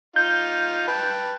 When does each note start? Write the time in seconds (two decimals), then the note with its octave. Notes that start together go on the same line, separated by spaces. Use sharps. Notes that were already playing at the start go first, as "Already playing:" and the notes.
0.16 D#4 F4 G6
0.88 B4 G5 A5